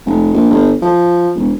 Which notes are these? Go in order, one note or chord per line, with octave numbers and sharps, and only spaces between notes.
F1
A#1
G1
F3
E1